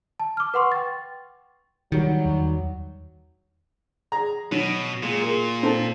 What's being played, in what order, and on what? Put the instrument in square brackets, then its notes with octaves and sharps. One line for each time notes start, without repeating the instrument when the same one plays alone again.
[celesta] A5
D6 F6
B4 F#5 C6 C#6
G5 A6
[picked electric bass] D#3 G3 [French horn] F#3
[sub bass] E2
[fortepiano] G#4 A#5
[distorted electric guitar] B2 [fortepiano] F#3
[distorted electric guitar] A#2 [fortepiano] G#3
[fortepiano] G#4 A#4
C4 A4 A5